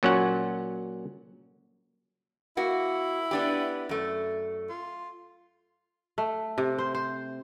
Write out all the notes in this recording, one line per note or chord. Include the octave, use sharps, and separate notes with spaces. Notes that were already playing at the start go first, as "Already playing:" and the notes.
A#2 F#3 C#4 C#5 F#5
A#3 E4 F#4
B3 D4 G4
F#2 A3
F4
A3
C3
C5
C5